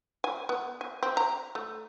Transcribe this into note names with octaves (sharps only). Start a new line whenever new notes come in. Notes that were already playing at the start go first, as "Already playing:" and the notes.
G#5
B3
G#5
C4
A#5
A3